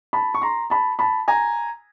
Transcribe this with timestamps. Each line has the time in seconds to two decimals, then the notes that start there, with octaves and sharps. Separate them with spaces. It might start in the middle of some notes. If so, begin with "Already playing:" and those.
0.13 A5 B5
0.34 C#6
0.42 A#5 C6
0.70 A5 B5
0.99 A5 B5
1.28 G#5 A#5